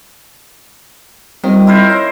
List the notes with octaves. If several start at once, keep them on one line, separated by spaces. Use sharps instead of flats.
D#3 G3 C4 F4
E4 A#4 C5
C#5 G6